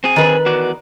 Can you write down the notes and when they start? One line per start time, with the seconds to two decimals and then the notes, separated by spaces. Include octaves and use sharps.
0.04 C4 G#4
0.16 D#3 B4
0.46 E2 F#4 D5